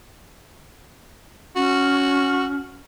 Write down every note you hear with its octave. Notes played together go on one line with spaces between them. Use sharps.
C#4 F#4